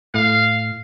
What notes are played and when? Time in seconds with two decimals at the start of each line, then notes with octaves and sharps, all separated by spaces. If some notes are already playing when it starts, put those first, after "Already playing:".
0.14 A2 F5